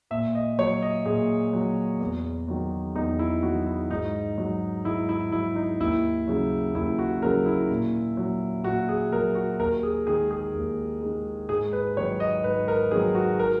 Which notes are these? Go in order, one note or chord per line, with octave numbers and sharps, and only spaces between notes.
A#2 E5
D#5
F#3 C#5
D#5
A#2 G#4
F#3
E2
D#3 F#3
E2 D#4
E4
D#3 F#3 F#4
E4
G#2 D#4
F#3
G#2 E4
E4
F#3 E4
D#4
D#2 E4
C#3 F#3
D#2 E4
F#4
C#3 F#3 A#4
E4
A#2
F#3
A#2 F#4
G#4
F#3 A#4
F#4
D#2 A#4
G#4
D#3 G#3 G#4
G#4
D#2
D#3 G#3
G#2 G#4
B4
D#3 F#3 C#5
D#5
G#2 B4
A#4
D#3 F#3 G#4
F#4
A#4